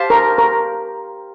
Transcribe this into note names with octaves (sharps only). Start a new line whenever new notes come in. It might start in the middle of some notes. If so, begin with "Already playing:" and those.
Already playing: G4 C5 F5 A5
A#4
A#4